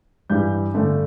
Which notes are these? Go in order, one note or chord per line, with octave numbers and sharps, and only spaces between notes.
G2 E3 G3 G6
G2 D3 A3